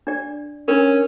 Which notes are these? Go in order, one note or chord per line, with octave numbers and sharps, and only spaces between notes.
D4 D5
C#4 D4 A#4